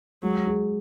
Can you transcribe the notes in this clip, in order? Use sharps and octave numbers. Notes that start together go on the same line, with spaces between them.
F#3 G#3
G#4